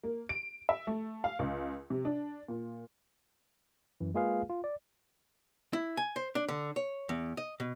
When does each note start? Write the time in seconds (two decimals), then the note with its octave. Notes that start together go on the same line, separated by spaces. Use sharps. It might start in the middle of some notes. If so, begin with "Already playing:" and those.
0.04 A#3
0.29 D7
0.69 E5
0.87 A3
1.24 F5
1.39 C#2
1.90 C3
2.05 D4
2.48 A#2
4.01 F#2 E3
4.14 G#3 A#3 F4 G#4 B4 F5
4.50 F4
4.64 D5
5.73 E4
5.97 G#5
6.16 C5
6.35 D4
6.48 D3
6.76 C#5
7.09 E2
7.37 D#5
7.60 B2